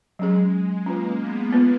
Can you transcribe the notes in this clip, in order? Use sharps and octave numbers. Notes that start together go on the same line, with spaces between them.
F#3 G#3 C#4 G#4
A#3 C#4 F4 B4
B3
B3 F4 B4